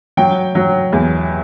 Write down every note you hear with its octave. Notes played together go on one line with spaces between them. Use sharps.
F#3 G5
F#3
E2